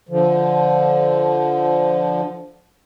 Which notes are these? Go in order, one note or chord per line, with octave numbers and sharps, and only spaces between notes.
D3 F3